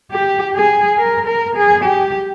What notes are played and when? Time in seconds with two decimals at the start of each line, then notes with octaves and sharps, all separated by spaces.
0.12 G4
0.55 G#4
0.98 A#4
1.27 A#4
1.56 G#4
1.84 G4